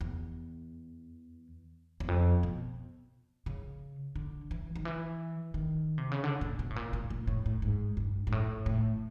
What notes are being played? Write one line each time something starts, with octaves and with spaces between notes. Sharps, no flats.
E2
E2
F2
B2
C#3
D3
E3
D#3
E3
D#3
C3
C#3
D3
A#2
B2
A2
A#2
A#2
A#2
A2
A2
G#2
G2
G#2
A2
A2